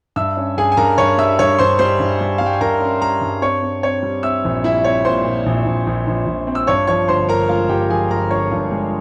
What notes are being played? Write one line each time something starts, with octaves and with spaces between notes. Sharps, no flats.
G2 E5 E6
C#4
G2 G#4 G#5
G#5
G2 A#4 A#5
G2 C#5 C#6
G3 E5 E6
G2 C#5 C#6
G2 C5 C6
G3 C5 C6
G2
G3
F5
G3
G5
G#5
G2 A#4 A#5
C#4
G3 A#4 A#5
G2
C4 C#5 C#6
C4
C4 C#5 C#6
G3
C4 E5 E6
A#1
G3 E4 E5
C4 C#5
A#2 C5 C6
A#2
A#1
A#1
A#1
A#1
A#1
C4
E6
G2 C#5 C#6
F3 C#5 C#6
G1 C5 C6
G1 A#4 A#5
G#3 F4 F5
G2 G4 G5
F3 G#4 G#5
G1 A#4 A#5
G1 C#5 C#6
G2
G#3